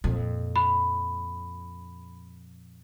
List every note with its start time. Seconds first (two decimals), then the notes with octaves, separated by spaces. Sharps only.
0.04 F2 A#2
0.56 B5